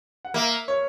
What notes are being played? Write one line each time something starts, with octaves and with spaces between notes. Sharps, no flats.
F#5
A#3 E5
C#5